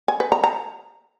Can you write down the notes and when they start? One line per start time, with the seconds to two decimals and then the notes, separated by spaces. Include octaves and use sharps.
0.08 G#5
0.20 B4
0.32 A#5
0.44 A#5